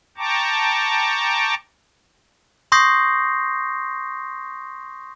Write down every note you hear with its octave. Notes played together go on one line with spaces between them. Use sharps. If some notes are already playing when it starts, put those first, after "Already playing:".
G5 A5 A#5 C#6 D6
C6 C#6 D#6 G6 A#6 C7